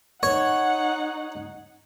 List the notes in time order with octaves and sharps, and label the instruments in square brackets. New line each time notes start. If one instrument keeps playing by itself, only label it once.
[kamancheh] D#4 F#5 [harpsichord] C#5